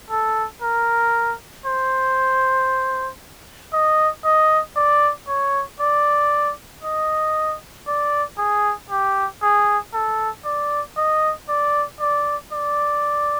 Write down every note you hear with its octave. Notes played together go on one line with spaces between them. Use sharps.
A4
A#4
C5
D#5
D#5
D5
C#5
D5
D#5
D5
G#4
G4
G#4
A4
D5
D#5
D5
D5
D5